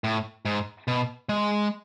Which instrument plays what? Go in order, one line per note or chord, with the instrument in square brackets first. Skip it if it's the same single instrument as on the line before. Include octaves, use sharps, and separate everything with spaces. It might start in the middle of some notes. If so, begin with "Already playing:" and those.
[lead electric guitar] A2
G#2
B2
G#3